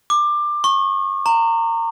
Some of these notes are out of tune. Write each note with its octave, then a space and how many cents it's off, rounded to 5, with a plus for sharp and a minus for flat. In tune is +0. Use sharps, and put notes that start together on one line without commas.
D6 +20
C#6 -25
A#5 -25